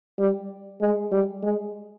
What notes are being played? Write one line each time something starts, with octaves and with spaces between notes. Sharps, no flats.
G3
G#3
G3
G#3